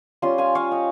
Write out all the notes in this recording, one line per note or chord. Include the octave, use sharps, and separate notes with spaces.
G3 C#4 F4 G#5 C6
F5 G#5
C#5 F5
D#5 G5